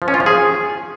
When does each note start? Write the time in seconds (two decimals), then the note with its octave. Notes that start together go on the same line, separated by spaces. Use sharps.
0.02 F3
0.08 C#4
0.14 F4
0.20 F3
0.26 G#4